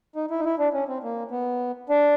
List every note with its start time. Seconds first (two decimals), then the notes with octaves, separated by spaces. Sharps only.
0.16 D#4
0.31 E4
0.40 D#4
0.45 E4
0.59 D4
0.74 C#4
0.88 C4
1.03 A#3
1.31 B3
1.89 D4